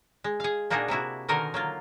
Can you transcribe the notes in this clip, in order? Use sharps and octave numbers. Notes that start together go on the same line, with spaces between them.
G#3
G#4 F5
A#2 A#3 D4 D#4 F#4 G#4
C3 A#3 E4 F#4
B2 D3 D#3 D#4 A#4 G#5
F#3 A#3 F4